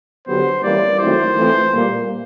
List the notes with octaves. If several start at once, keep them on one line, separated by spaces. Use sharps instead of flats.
D3 F#3 B3 D4 G4 C5
E3 G3 A#3 C#4 E4 D5
D#3 F#3 A3 C4 E4 C5
E3 A3 C4 F4
A#2 G3 A#3